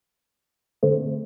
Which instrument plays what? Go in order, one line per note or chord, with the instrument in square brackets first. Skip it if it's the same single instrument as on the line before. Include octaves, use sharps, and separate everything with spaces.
[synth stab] D3 A3 C4